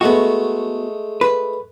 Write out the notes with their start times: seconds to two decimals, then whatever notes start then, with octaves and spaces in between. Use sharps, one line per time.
0.01 G#3 A3 B3 F#4
1.21 B4